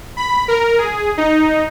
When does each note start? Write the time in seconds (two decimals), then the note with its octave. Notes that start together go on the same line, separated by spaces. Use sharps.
0.17 B5
0.48 A#4
0.78 G#4
1.18 D#4